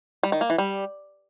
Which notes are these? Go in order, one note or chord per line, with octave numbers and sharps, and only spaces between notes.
G3
D#3
A#3
E3
G3